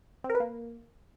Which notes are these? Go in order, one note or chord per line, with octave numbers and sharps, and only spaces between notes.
C4
A#4
B4
A#3